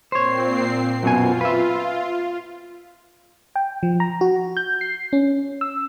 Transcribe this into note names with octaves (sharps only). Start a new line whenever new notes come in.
A#2 C4 C5 C#5 C7
F#2 B2 F4 G#5
B4 E5
G5
F3
A#5
F#4
G6
C7
C#4
E6